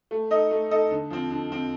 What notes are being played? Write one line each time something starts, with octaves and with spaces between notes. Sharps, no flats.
A3
D#4 A4 D#5
A3
D#4 A4 D#5
D3
F3 C4
D3
F3 C4